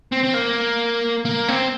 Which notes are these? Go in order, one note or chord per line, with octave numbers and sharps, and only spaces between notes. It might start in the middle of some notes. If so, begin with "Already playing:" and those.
C4
C4
A#3
A#3
C4